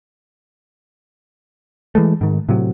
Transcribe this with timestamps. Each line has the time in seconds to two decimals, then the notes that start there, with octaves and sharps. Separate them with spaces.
1.95 E3 G#3 A3
2.21 G#2 D#3
2.49 A2 C3 F#3